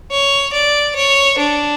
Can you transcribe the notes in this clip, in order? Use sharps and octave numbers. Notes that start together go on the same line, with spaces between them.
C#5
D5
C#5
D4